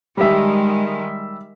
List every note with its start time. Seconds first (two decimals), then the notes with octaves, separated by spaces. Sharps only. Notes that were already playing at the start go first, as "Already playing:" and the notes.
0.17 D#3 G3 G#3 E5